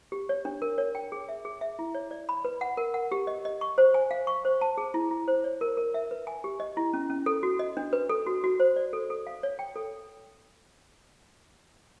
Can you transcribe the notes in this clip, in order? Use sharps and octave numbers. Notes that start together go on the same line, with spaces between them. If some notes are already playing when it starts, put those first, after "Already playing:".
G4
C#5
D4
A#4
C#5
G5
G#4
E5
G#4
E5
E4
C#5
D5
B5
B4
F#5
A#4
F#5
G4
D#5
D#5
C#6
C5
G#5
F5
C#6
C5
A5
G#4
E4
E4
C5
C#5
A#4
A#4
E5
B4
G#5
G4
D#5
E4
C#4
C#4
A4
F#4
D#5
D4
B4
A4
F#4
F#4
C5
D5
A4
A4
F5
C#5
G5
A4